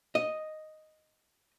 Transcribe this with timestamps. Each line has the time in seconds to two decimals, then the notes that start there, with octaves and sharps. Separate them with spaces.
0.15 D#5